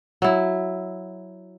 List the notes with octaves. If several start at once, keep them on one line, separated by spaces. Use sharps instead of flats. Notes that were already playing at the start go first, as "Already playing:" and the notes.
F#3 E4